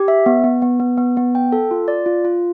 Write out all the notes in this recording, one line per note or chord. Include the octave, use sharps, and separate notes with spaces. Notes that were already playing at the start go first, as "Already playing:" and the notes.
Already playing: G4
E5
B3
B3
B3
B3
B3
B3
G5
A4
F4
D5
F4
F4